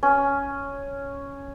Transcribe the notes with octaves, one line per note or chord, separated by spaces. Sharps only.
C#4